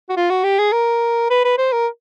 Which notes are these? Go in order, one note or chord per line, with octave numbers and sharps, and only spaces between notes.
F#4
F4
F#4
G4
G#4
A#4
B4
B4
C5
A#4